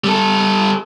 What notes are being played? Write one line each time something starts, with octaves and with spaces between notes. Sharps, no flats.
G3 A4